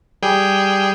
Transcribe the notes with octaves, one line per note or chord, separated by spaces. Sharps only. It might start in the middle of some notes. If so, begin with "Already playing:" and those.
G3 G#4 G5